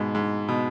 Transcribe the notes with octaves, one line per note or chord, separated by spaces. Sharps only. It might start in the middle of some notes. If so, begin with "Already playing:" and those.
Already playing: G#2 B2
G#2
B2